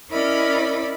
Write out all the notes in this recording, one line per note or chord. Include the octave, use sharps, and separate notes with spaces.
C#4 E4 A#4 D5 D#5 B5